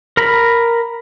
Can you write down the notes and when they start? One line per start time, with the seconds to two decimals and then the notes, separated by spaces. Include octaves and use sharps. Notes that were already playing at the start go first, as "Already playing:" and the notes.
0.17 A#4 A#5 B5